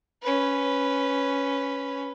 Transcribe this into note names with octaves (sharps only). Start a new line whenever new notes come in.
C#4 B4